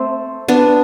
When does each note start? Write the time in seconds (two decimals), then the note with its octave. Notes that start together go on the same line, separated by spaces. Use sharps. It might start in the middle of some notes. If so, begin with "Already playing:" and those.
Already playing: A3 C4
0.48 B3 D4